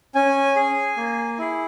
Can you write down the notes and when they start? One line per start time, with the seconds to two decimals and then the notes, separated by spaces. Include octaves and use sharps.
0.15 C#4 G#5
0.56 G#4
0.97 A#3
1.39 E4 G#4